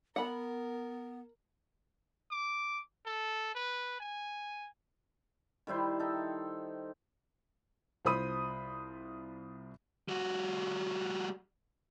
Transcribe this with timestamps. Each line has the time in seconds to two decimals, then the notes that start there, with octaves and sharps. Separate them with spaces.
0.16 B3 A#4 F#5 B5
2.31 D6
3.06 A4
3.55 B4
4.00 G#5
5.67 D#3 G3 E4 C5
5.99 D#4 A4
8.05 C2 F4 C5 B5 D#6 D#7
10.08 G3 F#4